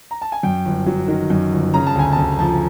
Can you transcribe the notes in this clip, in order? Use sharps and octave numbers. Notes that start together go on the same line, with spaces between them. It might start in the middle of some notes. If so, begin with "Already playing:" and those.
A#5
A5
G#5
F#2 G5
G1
F#3
D#3
F#2
G1
C#3 A#5
A5
D2 G#5
D2 A5
F3 A5